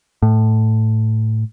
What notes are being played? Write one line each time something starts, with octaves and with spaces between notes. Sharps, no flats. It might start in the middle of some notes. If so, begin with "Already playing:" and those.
A2